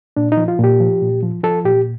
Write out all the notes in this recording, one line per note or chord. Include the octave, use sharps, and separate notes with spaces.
A#2 D4
D#4
F3
F4
A#2 G4
F3
A#2
F3
F3 A4
A#2 G4